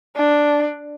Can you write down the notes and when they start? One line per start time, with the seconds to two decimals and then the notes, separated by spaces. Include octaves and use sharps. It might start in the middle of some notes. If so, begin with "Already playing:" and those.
0.16 D4